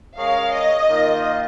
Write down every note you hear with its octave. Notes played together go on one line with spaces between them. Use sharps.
G#3 C#4 A#4 C#5 F5
D#5
D#3 A#3 F4